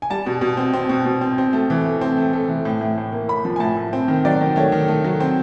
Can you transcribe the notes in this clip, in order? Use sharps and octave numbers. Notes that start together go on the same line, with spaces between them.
G#5
G3 A5
B2
B2
C4
C4
B2
B2
C4
C4
A3
E3
A3
C4
A3
A3
E3
A2
A2
A2
A#3
A2 B5
F3
G#5
A2 A5
A2
C4
D#3
F#3 D5
D#3
A3 C#5
D#3
A3
F#3
C4